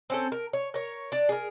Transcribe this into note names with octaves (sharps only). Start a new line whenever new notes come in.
C4 C#4 A4
A#4
C#5
A#4 C#5
D4 D5
G#4 A#4